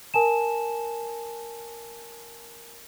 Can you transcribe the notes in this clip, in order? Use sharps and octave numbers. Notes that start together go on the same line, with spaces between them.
A#4 G#5 A5 E7